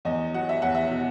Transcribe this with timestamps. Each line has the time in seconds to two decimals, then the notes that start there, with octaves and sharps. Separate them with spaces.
0.05 E2 D#5
0.34 F#3 F#5
0.49 E5
0.62 E2 F#5
0.75 E5
0.91 B2